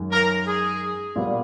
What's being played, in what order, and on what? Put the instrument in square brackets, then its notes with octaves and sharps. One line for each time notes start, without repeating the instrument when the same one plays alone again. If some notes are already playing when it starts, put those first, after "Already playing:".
Already playing: [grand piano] F#2 D#3 G#3 C#4
[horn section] A#4
G#4
[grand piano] A#2 G3 B3